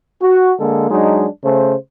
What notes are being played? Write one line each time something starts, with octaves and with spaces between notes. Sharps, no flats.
F#4
D3 G#3 A#3 A4
F#3 G#3 D4 D#4
C#3 A3 C5